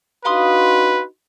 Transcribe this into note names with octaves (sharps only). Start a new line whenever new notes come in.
D4 D#4 F#4 B4 F5 C6 D#6